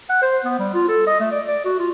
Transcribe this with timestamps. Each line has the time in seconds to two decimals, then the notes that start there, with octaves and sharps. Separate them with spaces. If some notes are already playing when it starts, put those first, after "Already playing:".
0.10 F#5
0.22 C5
0.45 B3
0.59 G3
0.74 F4
0.88 A4
1.07 D#5
1.20 A3
1.32 D5
1.48 D5
1.65 F#4
1.79 F4